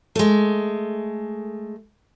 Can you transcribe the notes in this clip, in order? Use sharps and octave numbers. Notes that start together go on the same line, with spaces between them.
G#3 A3